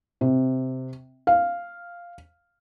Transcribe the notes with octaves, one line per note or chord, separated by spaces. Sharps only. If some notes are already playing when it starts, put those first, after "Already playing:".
C3
F5